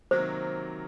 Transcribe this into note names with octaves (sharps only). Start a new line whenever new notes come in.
C3 D#3 F#3 A#3 C5